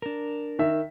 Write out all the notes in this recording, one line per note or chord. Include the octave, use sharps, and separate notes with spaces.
D4 A#4
D#3 E5